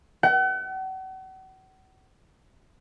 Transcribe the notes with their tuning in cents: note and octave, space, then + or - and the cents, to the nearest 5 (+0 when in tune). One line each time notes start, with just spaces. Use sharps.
F#5 +40